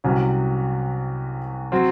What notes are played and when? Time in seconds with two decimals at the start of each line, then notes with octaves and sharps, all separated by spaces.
0.04 C2 C3 F#3 C#4
1.72 F#3 C4